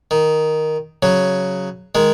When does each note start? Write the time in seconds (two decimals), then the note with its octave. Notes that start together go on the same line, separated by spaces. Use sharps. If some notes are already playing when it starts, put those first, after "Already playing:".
0.11 D#3
1.03 C#3 F#3
1.95 D#3 G#3